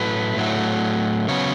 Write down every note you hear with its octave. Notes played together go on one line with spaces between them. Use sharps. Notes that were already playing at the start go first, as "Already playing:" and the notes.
Already playing: A2 F#3 A3 B4
A2 F#3 A3
C#3 F#3 B3 C#5